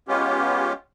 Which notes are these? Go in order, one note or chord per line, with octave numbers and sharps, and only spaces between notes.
G#3 B3 C#4 F4 G4